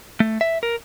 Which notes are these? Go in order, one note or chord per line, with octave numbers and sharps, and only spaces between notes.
A3
E5
A#4